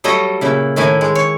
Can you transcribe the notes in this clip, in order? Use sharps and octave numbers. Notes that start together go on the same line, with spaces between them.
F#3 G3 A3 A4 C#5 D#5
A#2 C#3 E4
A2 D#3 A3 E4 G#5
G#3
C#5